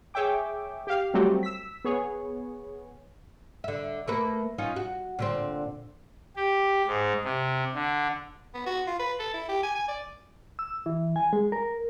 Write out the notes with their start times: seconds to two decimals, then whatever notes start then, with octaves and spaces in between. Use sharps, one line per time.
0.14 G#4 C#5 E5 G5 D6
0.87 G4 F5
1.14 F#3 G3 A3 C4 F#4 G4
1.43 E6 B6
1.85 B3 G#4 C#5
3.64 D3 E5
4.07 A3 A#3 B4
4.58 C#4 D#4 F4
4.76 F#4
5.19 A#2 D3 C4
6.36 G4
6.87 G#2
7.24 C3
7.74 D3
8.54 B3
8.66 F#4
8.87 F4
9.00 B4
9.19 A4
9.34 E4
9.49 G4
9.64 G#5
9.75 G#5
9.88 D5
10.59 E6
10.86 E3
11.16 G#5
11.33 G#3
11.52 A#4